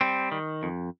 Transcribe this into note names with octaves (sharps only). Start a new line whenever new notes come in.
G3 C4
D#3
F2